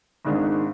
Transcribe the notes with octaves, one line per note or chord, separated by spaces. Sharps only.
G#1 G#2 D#3 G#3 D4